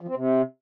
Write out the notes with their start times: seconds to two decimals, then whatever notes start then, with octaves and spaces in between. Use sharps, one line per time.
0.01 F3
0.08 C4
0.15 C3